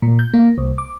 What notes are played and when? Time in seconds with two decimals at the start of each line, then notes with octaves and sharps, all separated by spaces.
0.02 A#2
0.19 G6
0.34 A#3
0.58 C2
0.78 D6